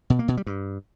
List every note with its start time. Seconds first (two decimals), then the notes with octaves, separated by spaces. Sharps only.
0.10 B2
0.19 A#3
0.28 B2
0.37 G3
0.46 G2